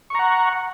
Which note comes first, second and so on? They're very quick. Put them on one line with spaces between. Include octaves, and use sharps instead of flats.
C#6 A#5 F#5